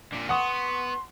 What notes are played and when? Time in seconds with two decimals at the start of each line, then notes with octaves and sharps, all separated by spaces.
0.12 A#2 D3
0.29 B3 F#5 C6 C#6 D#6